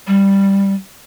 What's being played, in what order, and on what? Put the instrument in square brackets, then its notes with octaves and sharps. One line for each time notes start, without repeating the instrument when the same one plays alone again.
[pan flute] G3